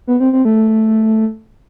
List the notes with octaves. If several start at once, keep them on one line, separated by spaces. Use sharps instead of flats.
B3
C4
C4
A3